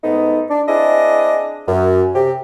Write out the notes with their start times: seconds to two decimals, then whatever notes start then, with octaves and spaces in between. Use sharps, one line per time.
0.03 G#2 A3 B3 D#4
0.49 D4
0.68 C4 D4 E4 G#4 D#5
1.68 F#2
2.14 C3 G4